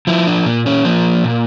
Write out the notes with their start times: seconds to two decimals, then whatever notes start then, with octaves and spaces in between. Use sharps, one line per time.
0.07 F3 E4
0.27 D4
0.46 A#2 A#3
0.66 C#4
0.85 F3 A#3
1.24 A#2